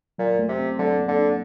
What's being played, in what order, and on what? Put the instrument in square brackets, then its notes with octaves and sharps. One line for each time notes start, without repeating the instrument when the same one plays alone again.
[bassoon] A#2 [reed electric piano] F#3
[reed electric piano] A3
[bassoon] C3
[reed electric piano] C4
[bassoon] D3 [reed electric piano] F#3
[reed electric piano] A#3
[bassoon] D3
[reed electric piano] D4